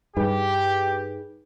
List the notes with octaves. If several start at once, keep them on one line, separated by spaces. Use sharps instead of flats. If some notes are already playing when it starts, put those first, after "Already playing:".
G2 G3 D#4 G4 G#4 B4